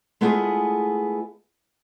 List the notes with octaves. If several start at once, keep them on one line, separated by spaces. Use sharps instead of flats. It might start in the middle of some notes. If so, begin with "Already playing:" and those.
G#3 A3 B3 E4 F4 G#4